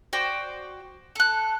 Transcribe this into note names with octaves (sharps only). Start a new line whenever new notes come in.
F#4 C5 D5 G5
A4 F#6